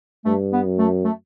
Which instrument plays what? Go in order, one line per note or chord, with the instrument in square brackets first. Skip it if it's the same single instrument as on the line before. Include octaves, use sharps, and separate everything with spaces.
[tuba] G2 [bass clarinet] A3
[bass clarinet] B3
[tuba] F#2
[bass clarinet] A3
A3